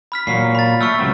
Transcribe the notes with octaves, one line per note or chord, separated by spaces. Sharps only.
B5 F6 B6
A#2 F#3 C7
B5 A6
A3 C#6 E6 F6
C#2 F#3 C4